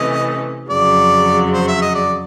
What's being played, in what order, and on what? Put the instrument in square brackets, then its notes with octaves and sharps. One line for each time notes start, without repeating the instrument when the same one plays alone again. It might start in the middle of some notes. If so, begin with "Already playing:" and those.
Already playing: [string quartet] C3 E3 A3 C#4 [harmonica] D#5
[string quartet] F2 C#3 F#3 [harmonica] D5
[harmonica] C5
E5
D#5
D5